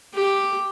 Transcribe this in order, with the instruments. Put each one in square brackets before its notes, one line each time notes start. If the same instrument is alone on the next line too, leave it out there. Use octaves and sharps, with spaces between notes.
[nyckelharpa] G4